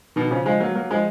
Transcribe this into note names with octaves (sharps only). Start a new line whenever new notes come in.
B2 D#3
C#3 F3
F3 G#3
F#3 A#3
F#3 A#3
F3 G#3